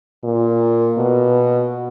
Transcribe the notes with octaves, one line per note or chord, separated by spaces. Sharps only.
A#2
B2